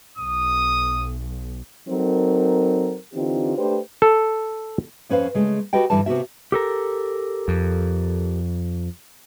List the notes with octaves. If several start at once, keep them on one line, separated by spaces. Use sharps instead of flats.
B1 D#6
F#3 C4 D#4 A4 A#4
D3 E3 C4 D#4 F4 G4
A3 D4 G4 B4 C5
A4
F2 C#4 B4 C5 F5
C#3 G#3 A3
F#4 G4 A4 B4 D#5 G5
G2 D3 E3 G3 B4 A5
C3 B3 F#4 E5
G4 A4 A#4
F2